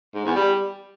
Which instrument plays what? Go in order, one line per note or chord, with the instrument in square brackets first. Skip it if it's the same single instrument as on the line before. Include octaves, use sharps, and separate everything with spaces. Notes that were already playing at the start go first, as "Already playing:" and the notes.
[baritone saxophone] G#2
E2
G3